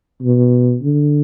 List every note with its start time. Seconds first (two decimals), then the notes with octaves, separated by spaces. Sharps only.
0.22 B2
0.83 D3